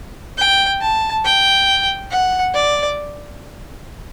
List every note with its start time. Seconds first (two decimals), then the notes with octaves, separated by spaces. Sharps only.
0.37 G5
0.81 A5
1.24 G5
2.11 F#5
2.54 D5